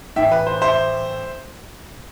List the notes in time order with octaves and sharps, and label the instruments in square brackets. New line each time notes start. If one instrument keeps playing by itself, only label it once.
[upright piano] A1 A2 E3 E5 G5
B4
C5
C5 E5